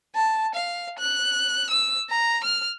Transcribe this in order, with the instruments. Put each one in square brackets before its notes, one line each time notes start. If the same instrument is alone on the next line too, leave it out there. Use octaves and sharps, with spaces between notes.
[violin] A5
F5
F#6
E6
A#5
F6